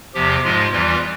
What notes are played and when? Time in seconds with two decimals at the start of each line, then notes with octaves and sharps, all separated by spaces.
0.14 E2 C3 F3 G4
0.44 G#2 F3 G#3 F4
0.72 E2 E3 G3 F4